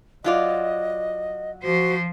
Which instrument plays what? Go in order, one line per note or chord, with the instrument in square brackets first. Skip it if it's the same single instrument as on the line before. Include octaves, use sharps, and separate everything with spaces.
[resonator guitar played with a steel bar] F#3 F4 D5 [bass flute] D#5
[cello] F3 C5 [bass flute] F#4